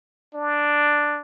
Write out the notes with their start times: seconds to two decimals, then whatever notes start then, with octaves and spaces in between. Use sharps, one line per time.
0.34 D4